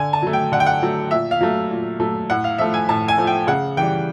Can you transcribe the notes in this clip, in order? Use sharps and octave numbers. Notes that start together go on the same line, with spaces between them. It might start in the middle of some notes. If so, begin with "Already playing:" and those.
Already playing: D3 G#5
A5
F#3 A3
G5
D3 F#5
G5
F#5
F#3 A3
A#2 E5
F5
F#3 A3
A#2
F#3 A3
A2 F#5
F5
F3 A3 E5
G#5
A2 A5
G#5
F3 A3
G5
C#3 F#5
E3 G3 G5